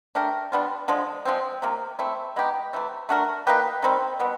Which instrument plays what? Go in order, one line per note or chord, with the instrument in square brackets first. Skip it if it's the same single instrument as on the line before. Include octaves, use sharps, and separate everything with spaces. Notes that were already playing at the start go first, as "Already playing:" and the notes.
[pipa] A3 D4 G4 A#4
G3 B3 D4 F4
D3 F3 G#3
F3 G#3 C4
C3 F3 A#3
A3 C4 E4
G#3 B3 D#4 G4
C3 E3 A3
A3 D4 F#4 A#4
A#3 D#4 G4 B4
D#3 G3 C4
B2 G3 B3